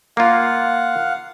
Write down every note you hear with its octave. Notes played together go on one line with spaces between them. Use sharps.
A#3 F4 F5 F#5